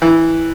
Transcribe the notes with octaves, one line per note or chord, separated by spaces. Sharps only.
E3